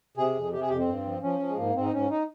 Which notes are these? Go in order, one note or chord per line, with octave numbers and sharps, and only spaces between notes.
C3 G#4
F2
C3 G4
G#4
F2 G4
C4
G2
F3
F3 C#4
F3
G#3
G#2 A#3
G#2 C4
D#4
G#2 C#4
D#4